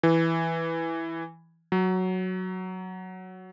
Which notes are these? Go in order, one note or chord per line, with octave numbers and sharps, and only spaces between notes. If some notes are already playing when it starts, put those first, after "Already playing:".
E3
F#3